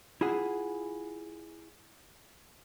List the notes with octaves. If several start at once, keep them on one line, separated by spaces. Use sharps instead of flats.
E4 F4 G#4 F#5